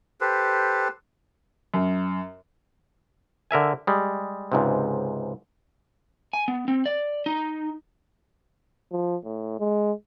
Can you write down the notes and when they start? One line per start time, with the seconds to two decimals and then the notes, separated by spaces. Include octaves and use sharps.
0.21 G4 A4 B4 C5
1.74 F#2
3.51 D3 A#4 E5 G#5
3.87 G3 G#3
4.52 C#2 G#2 C3
6.33 G#5
6.48 B3
6.68 C4
6.86 D5
7.26 D#4
8.92 F3
9.24 A2
9.60 G#3